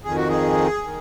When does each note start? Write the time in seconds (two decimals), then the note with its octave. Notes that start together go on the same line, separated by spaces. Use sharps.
0.04 F2 D#3 G#4
0.16 F#4
0.28 G#4
0.84 D#3